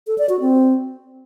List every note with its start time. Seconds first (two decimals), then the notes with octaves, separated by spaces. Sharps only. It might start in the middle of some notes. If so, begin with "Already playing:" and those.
0.07 A4
0.18 D5
0.29 F#4
0.40 C4